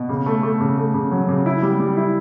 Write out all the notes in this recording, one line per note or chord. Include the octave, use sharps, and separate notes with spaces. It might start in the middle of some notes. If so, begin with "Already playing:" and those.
Already playing: B2
C#3
A3
A3
C#3
A3
C#3
F#3
C#3
E4
G3
G3
E4